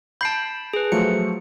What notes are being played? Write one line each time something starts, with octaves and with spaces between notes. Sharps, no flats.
A5 B5 G6 C7 D7
G#4 B4
F3 F#3 A3 C#7